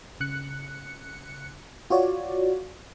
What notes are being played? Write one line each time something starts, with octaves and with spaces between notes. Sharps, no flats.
C#3 F#6 C#7
F4 F#4 C#5 D5